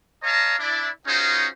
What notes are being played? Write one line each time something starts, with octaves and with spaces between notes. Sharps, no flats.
C#5 D#5 F5 A5 A#5
D4 E4 D5
C#4 D#4 F4 F#4 G#4 C5